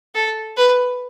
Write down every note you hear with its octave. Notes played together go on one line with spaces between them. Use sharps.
A4
B4